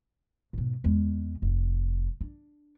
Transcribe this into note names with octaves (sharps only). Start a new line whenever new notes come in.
G#2 B2
E2 G#3
F1
D4